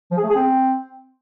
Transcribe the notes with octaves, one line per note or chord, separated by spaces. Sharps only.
F3
G#4
A3
G#4
C4